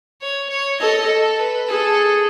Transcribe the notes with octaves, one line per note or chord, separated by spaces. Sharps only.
C#5
C#5
A4 D#5
A4
B4
G#4 A4